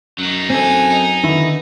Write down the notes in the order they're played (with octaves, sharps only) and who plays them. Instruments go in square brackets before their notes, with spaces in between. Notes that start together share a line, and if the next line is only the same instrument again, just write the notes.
[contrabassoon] F#2 [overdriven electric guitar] F#3 D#4
[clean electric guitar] C4 A4 [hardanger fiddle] G#5
[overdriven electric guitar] D#4
[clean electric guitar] D3 D#3 E4 [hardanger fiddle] B3